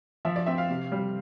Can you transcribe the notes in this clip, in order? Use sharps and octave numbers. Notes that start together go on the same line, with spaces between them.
F3 E5
D5
C4 E5
F5
C3
G3